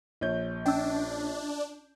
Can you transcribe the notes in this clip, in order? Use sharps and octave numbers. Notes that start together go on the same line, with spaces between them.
A#1 C#5 G6
C#4 D4 E6